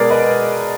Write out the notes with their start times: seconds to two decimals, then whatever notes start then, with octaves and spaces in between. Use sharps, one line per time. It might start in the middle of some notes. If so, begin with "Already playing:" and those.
Already playing: B2 G#3 B3 G#4 A#4 B4 D5
0.10 B4 D#5